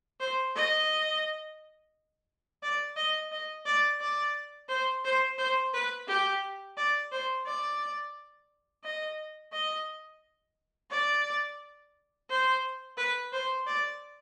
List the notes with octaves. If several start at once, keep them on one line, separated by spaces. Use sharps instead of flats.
C5
D#5
D5
D#5
D#5
D5
D5
C5
C5
C5
B4
G4
D5
C5
D5
D#5
D#5
D5
C5
B4
C5
D5